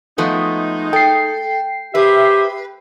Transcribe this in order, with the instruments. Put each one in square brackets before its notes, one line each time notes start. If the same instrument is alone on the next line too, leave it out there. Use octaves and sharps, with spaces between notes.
[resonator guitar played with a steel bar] F3 A3 B3 [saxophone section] G#3 D#4
[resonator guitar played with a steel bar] A4 [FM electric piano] G5 C7
[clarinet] G4 [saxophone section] G#4 C5 E5 [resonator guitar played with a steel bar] B4